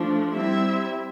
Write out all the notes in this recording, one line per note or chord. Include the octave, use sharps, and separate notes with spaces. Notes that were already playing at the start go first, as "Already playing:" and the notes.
Already playing: F3 A3 D4
G3 C4 E4 E5